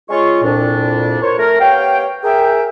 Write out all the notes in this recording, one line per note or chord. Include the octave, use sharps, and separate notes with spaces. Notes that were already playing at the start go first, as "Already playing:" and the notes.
G#3 C#4 F4 C#6
C2 F2 A#2 D4
A#4 C5 C#5
A3 A#4
B3 G4 C#5 F5 G5
G#4 A#4 E5 G5